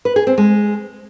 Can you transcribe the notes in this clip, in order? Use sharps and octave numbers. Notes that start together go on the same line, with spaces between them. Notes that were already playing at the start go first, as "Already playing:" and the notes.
B4
G#4
C4
G#3